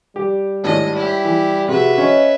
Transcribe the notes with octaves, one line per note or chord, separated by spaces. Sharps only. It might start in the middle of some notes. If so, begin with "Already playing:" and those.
G3 G4
G#1 A2 D4 D#5
E4 G4
E3
C3 F#4 G#4 B4 E5
C#4 C#5 D#5